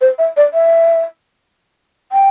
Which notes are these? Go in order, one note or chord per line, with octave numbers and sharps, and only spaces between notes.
C5
E5
D5
E5
G5